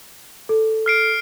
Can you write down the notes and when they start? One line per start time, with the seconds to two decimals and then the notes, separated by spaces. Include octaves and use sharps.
0.49 A4
0.86 F6 C7 D7